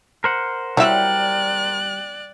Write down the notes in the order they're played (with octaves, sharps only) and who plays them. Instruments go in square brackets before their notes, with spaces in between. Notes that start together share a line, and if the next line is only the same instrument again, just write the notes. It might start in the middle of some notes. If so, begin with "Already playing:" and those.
[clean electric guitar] A#4 C5 F#5
[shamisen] F#3 E4 E5 [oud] G3 [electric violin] D5 F#6